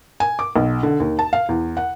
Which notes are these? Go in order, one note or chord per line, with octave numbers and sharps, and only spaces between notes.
G#5
D6
B1
D3
D#2
A5
F5
E2
F#5